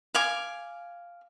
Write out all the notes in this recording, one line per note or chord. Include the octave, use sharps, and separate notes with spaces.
F5 G#5 D6